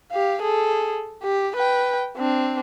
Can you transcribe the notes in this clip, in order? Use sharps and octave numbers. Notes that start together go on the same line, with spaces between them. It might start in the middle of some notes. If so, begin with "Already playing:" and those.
G4 F5
G#4 A4
G4
B4 G5
C4 D4